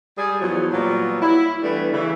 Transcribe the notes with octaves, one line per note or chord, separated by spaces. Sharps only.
G3 G#4
E2 F3 F#3
A#2 F#3 G3 B3 F4
E4
E3 G3 A3 B3 D4
C#3 E3